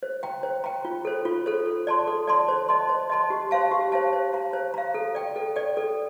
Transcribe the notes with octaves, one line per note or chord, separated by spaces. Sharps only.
C5
G5 A#5
C5
G5 A#5
F4
A4 C5
F4
A4 C5
A4
D5 A5 C6
A4
D5 A5 C6
C5
D#5 A5 C6
C5
D#5 A5 C6
G4
C5 F5 A5
G4
C5 F5 A5
C5
F5 A#5
C5
F5 A#5
A4
D5 G5
A4
D5 G5
A4